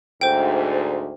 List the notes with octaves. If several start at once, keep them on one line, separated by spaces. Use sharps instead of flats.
D2 G#2 C5 G5